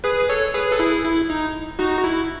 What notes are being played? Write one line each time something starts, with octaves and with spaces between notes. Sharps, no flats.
G#4 B4
A4 C#5
G#4 B4
A4
E4 G#4
E4
D#4
D#4 F#4
F#4
E4